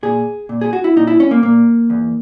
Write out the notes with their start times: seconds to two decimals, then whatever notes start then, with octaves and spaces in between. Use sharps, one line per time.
0.03 A#2 G#4
0.49 A#2
0.61 G#4
0.73 F#4
0.84 E4
0.96 A#2 D#4
1.07 E4
1.20 C#4
1.31 A#3
1.42 A#2 A#3
1.90 E2